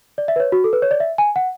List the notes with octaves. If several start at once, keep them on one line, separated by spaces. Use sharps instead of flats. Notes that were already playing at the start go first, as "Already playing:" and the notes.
D5
E5
B4
C#5
F#4
A4
B4
C#5
D5
E5
G#5
F#5